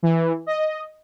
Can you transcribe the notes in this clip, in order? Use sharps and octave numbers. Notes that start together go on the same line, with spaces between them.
E3
D#5